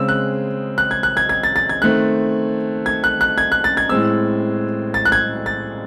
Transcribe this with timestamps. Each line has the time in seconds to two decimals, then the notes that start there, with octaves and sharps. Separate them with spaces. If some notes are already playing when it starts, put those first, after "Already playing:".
Already playing: C#3 G#3 C4 E6
0.08 F#6
0.78 F#6
0.91 G#6
1.03 F#6
1.17 G#6
1.29 G#6
1.43 A6
1.56 A6
1.69 G#6
1.82 D#3 A3 C4 F#6
2.86 G#6
3.04 F#6
3.21 F#6
3.38 G#6
3.52 F#6
3.64 A6
3.77 G#6
3.89 A2 G#3 C4 E6
4.94 A6
5.05 F#6
5.12 G#6
5.46 A6